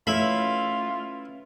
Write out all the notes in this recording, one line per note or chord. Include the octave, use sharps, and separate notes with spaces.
A3 C#4 E4 F4 B4 E5 B5